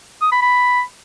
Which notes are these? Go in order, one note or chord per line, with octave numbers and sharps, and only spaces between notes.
D#6
B5
B5